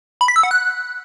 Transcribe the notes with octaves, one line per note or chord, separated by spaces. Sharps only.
B5
B6
E6
F#5
F#6